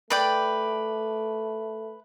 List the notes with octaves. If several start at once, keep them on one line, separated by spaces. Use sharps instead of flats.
A3 B4 D5 G5